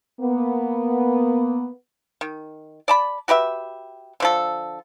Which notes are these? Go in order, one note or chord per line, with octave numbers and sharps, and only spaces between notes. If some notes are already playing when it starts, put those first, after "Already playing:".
A#3 B3
D#3
D5 A5 B5
F#4 G4 B4 E5
D3 F3 A4